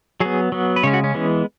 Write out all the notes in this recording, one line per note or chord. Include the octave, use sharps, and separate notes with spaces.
F#3 B3 G#4
F#3 B3
B4
C#3 G#3 C#4 C#5
F#4
C#4
E3 G#3 B3